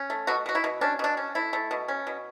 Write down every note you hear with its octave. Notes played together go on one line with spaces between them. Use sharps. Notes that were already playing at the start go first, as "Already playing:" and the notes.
Already playing: C#4
A3
B2 F#4
B2 F#4
E4
B2
C#4 D4
B2 D4
C#4
A3 E4
A3
B2
C#4
B2